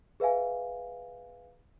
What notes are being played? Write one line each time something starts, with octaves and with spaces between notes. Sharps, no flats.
G#4 B4 E5 F5 G#5